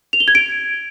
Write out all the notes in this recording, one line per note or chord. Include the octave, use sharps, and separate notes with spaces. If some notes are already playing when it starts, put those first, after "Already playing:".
F7
G7
G#6
D7